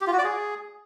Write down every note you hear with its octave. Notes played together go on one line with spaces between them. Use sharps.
G4
F4
F#4
D5
G#4